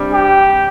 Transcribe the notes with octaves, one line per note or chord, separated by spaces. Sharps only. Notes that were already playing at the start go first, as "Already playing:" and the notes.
Already playing: C3 G3 D4
G4